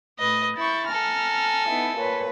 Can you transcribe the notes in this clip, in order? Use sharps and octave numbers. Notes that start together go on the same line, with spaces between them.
A2 B4 D#5 D#6
E4 C#6 G6 A6
A4 G#5 A#5 F6
B3 D#4 E4
A#2 B4 C#5